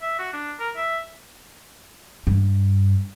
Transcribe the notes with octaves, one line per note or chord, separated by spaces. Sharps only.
E5
F#4
D4
A#4
E5
G2